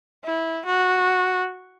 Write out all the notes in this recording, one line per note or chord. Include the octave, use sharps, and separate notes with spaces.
E4
F#4